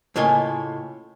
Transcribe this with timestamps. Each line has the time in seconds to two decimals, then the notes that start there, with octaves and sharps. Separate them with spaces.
0.16 A2 C#3 A#3 F4 D#5 G#5